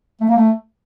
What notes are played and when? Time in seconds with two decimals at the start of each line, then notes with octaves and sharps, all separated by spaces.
0.21 A3
0.29 A#3
0.37 A3